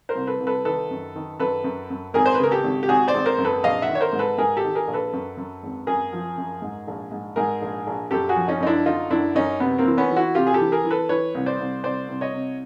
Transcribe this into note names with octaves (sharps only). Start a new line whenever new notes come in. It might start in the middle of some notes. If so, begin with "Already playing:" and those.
A#4 C5
C2
A4 B4
C2
A4 B4
D#3 A4 B4
F#2
D#3
F#2 A4 B4
F#2
F#2
G#1 G#4 A#4
C5
B4
C#3 A#4
G4 A4
G#1
G4
G#1 F#4 G#4
C5 D5
G#1
A#4 C5
F#2
A4 B4
A#1 D#5 F5
E5 F#5
D#3
C#5
A#4 C5
G#2
A4 B4
G#2 G#4 A#4
G4 A4
D#3
G#4 A#4
A#1
A4 B4
F#2
F#2
G#1
F#2 G#4 A#4
F3
F#2
G#2
A#1
G#2
G#2 G#4 A#4
A#1
A#1
F#2 G4 A4
F#4 G#4
F3
C#4 D#4
F#2 D#4
D4 E4
D3 D#4 F4
F#2 D4 E4
F#2 C#4 D#4
C3 B3
A#3 C4
E3
B3 C#4
E3
E4 F#4
C3 F4 G4
G#4
G4 A4
E3
G#4 A#4
E3
A4 B4
E3 B4 C#5
C2
C5 D5
C2
C2 C5 D5
C2
C#5 D#5
C3